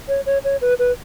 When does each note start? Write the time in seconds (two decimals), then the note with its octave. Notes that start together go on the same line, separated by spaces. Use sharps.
0.09 C#5
0.26 C#5
0.44 C#5
0.61 B4
0.79 B4